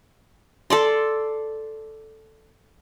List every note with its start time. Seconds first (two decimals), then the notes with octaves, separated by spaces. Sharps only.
0.70 A4 D5 C6